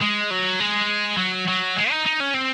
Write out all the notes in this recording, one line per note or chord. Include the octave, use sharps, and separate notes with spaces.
G#3
F#3
G#3
F#3
F#3
G#3
D#4
D#4
C#4
C4